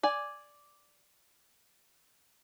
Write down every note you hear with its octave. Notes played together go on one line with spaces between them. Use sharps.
D5 G#5